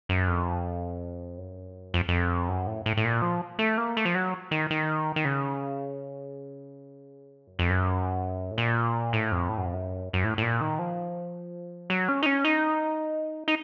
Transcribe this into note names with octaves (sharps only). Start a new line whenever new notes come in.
F#2
F2
F#2
F2
F2
F#2
A2
A2
A2
A#2
F3
A3
A#3
A3
F3
F#3
D#3
D#3
D#3
C#3
F#2
F2
F#2
A2
A#2
A2
F2
A2
F#2
F2
F#2
F#2
A2
A2
A#2
D#3
F3
F#3
C#4
D#4
C#4
D#4
D#4